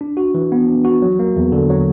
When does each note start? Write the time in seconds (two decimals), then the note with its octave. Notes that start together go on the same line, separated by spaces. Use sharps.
0.01 D4
0.17 F#4
0.34 E3
0.52 B3
0.68 D4
0.85 F#4
1.02 F#3
1.19 A#3
1.36 E2
1.52 D3
1.70 F#3